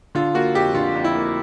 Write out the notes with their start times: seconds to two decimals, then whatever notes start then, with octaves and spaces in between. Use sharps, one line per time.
0.15 D3 F4
0.34 A#3 F#4
0.54 F2 G4
0.75 D3 F4
0.95 F2
1.04 E4
1.15 A#3